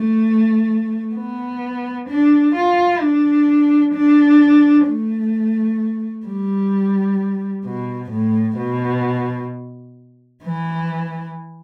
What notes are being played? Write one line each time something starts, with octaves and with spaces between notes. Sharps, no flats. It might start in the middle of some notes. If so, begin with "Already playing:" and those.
Already playing: A3
B3
D4
F4
D4
D4
A3
G3
B2
A2
B2
E3